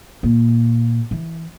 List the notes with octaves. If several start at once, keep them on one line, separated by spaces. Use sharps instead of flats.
A#2
E3